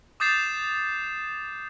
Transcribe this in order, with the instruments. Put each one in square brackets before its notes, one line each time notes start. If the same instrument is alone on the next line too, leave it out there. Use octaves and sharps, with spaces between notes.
[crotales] D6 D#6 G6 A6 C7 E7